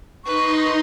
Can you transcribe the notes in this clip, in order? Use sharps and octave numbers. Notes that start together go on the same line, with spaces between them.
D#4 B4 D#5 C6 C#6